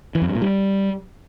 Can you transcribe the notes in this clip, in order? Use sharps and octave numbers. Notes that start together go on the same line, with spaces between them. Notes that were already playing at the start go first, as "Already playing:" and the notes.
E3
F2
G2
A#2
G3